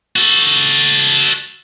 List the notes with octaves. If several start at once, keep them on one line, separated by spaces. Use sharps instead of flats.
F#4 A4